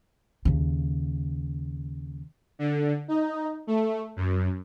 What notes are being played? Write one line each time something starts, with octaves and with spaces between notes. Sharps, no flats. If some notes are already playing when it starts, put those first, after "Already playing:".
D#2 C#3
D3
D#4
A3
F#2